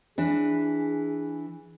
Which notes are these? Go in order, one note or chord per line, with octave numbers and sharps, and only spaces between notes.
E3 D4 G#4